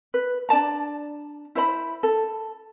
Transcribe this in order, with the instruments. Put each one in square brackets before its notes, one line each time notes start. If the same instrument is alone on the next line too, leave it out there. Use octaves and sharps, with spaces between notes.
[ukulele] B4
D4 D5 A5 A#5
E4 C5 C#5 B5
A4